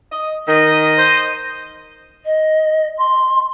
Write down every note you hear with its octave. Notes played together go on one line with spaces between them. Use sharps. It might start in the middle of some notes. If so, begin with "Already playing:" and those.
D#5
D#3 D#5
C5
D#5
C6